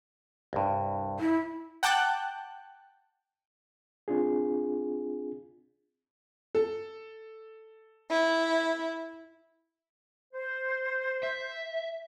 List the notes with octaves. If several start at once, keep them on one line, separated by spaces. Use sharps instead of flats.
C2 G2
E4
F#5 G5 A5 D6 F#6 G6
C4 D4 F4 G#4
A4
E4
C5
E5